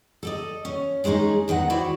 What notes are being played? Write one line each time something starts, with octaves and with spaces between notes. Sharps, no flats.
A4 D5 D#5
C#4
D#3 G#3 C#4 D#4 G#4
E2 D#3 D#4 F#5
E4 F#4 C5 D5 F#5